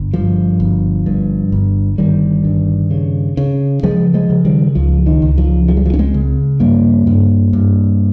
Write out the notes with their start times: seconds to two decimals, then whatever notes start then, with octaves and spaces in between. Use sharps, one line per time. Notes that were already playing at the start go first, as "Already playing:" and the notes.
Already playing: G1
0.13 G2 F3
0.60 G1
1.06 G2
1.52 G1
1.98 G1 D#3 G3
2.44 G2
2.91 C#3
3.37 C#3
3.83 C#3 F3 G#3
4.14 F3 G#3
4.30 C#3
4.45 D#3 G3
4.75 C#2 F3
5.06 D#3
5.22 C#2
5.38 F3
5.68 C#3 F3
5.77 G3
5.86 F3
5.94 C#4
5.99 G#3 C4
6.14 C#3
6.60 G2 G3 A#3
7.07 G2
7.53 G2